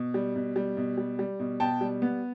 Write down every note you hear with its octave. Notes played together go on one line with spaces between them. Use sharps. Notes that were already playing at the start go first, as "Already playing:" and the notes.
Already playing: B2
G3
B2
G3
B2
G3
G3
B2
B2 G5 A5
G3
B3